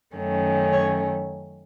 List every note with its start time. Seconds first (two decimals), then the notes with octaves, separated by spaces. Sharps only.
0.15 F#2 D#3 A3 C#4
0.72 C#5